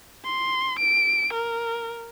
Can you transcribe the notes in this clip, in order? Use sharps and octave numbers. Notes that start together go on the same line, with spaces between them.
C6
D7
A#4